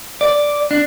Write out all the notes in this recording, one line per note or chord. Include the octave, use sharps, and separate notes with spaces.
D5
D4